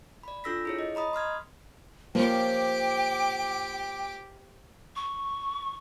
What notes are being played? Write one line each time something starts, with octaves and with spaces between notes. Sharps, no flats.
D5 B5
D4 F4 A4 E6 A#6 B6
E4 G#4 C#5
D#5
D#5 A#5 B5 D#6
C6 D#6 F6 G#6
F3 A#3 C#4 G4 G5 D6
C#6